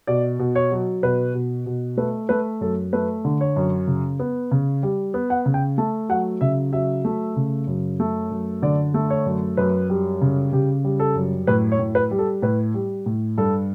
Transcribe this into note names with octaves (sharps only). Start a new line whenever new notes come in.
B2 D5
B2
C#5
F#3
B2 B4
B2
B2
A3 B4
A3 B4
F#2 A4
A3 B4
D3
C#5
F#2
C#3
B3
C#3
G3
B3
F#5
C#3
G5
A3 A5
F#3 F#5
C#3 E5
F#3 E5
A3
C#3
F#2
A3
F#2
D3 D5
A3
C#5
F#2
F#2 B4
G3
C#3
C#3 G4
G3
A4
F#2
A2 B4
C#5
A2
B4
G3
A4
A2 B4
G3
A2
G2 A4